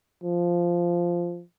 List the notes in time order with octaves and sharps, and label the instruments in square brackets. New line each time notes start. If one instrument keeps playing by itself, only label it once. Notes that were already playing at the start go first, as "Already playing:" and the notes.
[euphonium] F3